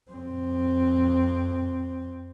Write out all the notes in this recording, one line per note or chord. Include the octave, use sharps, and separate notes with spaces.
F2 C4